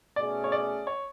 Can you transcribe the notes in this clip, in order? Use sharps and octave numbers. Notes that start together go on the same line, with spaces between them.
B2 A3 C#4 G#4 D5
C#5
D5
C#5